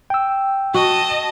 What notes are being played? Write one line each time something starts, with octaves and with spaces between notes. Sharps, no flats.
G5 E6
F#4 D#5 A5